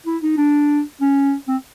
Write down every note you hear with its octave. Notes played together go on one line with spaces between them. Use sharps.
E4
D#4
D4
C#4
C4